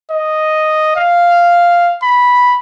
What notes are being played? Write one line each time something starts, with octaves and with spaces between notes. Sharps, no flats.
D#5
F5
B5